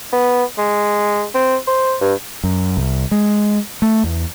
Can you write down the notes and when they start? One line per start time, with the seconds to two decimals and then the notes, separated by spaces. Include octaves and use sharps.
0.13 B3
0.58 G#3
1.35 C4
1.67 C5
2.01 G2
2.44 F#2
2.77 C2
3.11 G#3
3.82 A3
4.04 E2